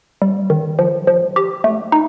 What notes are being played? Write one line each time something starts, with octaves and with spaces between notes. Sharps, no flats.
G3
D#3
F3
F3
G4
A3
D#4